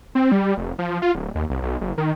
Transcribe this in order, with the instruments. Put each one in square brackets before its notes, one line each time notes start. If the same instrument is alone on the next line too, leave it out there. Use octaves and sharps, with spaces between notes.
[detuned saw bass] C4
G3
F1
F3
F4
D1
D#2
C2
B1
F#1
D#3